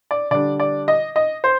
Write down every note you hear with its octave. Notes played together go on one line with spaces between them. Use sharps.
D5
D3 G3 D4 D5
D5
D#5
D#5
C5